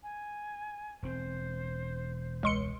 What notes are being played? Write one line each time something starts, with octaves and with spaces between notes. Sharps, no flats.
G#5
E1 C4 C5
C#2 C6 C#7